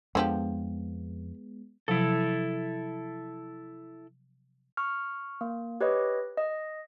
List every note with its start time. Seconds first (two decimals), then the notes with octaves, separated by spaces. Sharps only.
0.15 F2 D3 F3 G#3 B3 G4
1.88 C3 F3 F#3 E4 A4
4.77 C#6 F6
5.41 A#3
5.81 G4 B4 C#5 D#5
6.38 D#5